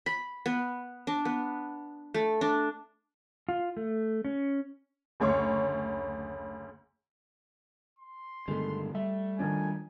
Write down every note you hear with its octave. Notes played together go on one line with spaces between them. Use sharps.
B5
B3
D4
B3
A3
D4
F4
A3
C#4
F#1 D2 C#5 C6 C#6
C6
G2 B2 D3 D#3 G#3 A3
G3 A3 E5
D#3 F3 D4 G#5